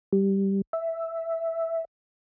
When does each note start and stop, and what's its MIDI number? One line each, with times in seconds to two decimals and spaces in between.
0.13 0.61 55
0.73 1.85 76